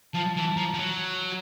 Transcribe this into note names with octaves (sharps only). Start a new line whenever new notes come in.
F3 A5
E3 A5
F3 A#5
F3
F#3